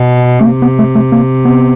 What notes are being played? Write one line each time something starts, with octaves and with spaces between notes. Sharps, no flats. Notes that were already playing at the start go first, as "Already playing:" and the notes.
Already playing: B2
A3
C3 A#3
B3
A3
A3
A#3
B3